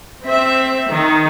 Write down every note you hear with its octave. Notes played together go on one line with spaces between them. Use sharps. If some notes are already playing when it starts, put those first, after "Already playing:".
C4 E5
D#3